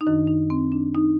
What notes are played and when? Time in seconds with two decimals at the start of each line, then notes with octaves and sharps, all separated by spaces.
0.01 D#4
0.07 F#2 D#3 D4
0.28 D#4
0.50 C4
0.72 D4
0.94 D#4